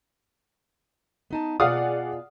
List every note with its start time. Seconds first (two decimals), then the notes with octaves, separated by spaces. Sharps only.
1.30 B3 D#4 A5
1.60 B2 F4 G#4 D5 F5 F#5 D#6